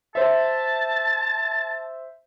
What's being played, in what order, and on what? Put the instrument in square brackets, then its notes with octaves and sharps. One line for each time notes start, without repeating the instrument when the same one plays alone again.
[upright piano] C5 E5 [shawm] A5